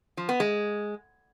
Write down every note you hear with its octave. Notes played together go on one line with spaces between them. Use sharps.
F3
B3
G#3